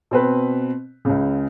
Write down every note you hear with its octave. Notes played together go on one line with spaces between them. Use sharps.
B2 C4 B4
C#2 C#3